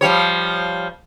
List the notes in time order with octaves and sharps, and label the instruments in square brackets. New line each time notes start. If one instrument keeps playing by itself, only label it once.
[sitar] F3 G3 C#5